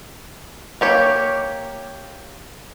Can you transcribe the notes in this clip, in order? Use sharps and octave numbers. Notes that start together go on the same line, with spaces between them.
A#3 G4 C#5